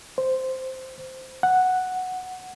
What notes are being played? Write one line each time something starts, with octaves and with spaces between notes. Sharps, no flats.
C5
F#5